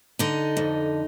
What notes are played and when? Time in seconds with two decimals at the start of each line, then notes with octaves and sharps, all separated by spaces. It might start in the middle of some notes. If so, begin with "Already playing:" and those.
0.19 D3 D#4
0.57 F2